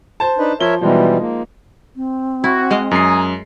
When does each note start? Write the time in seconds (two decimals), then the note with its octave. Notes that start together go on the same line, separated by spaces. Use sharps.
0.20 C5 A5
0.38 D4 D#4 B4
0.60 F3 A#4 C#5 E5 G7
0.81 B2 E3 F3 G3 G#3 D#4
1.21 A#3
1.96 C4
2.44 E4 F#4
2.71 G#3 D#5 F5
2.91 F#2 G#5 A#5 D#6 C7